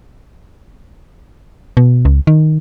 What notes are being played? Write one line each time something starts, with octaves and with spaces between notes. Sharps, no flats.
B2
C#2
D#3